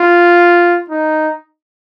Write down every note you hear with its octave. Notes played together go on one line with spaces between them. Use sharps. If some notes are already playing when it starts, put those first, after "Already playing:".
Already playing: F4
D#4